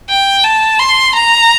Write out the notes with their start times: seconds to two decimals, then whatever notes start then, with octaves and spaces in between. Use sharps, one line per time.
0.09 G5
0.44 A5
0.79 C6
1.15 A#5